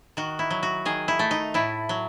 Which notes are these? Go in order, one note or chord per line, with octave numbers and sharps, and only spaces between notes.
D#3 F#4
E4
F#3
F#4
D#3 G#4
E4
A3
D#4
A2 E4
F#3